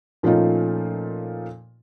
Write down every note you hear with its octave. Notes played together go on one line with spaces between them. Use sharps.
A#2 F3 A3 C#4 D#4 F4